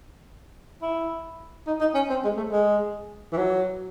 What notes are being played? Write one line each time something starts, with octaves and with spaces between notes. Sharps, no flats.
E4
D#4
D#4
C#4
C4
G#3
A3
G#3
E3
F#3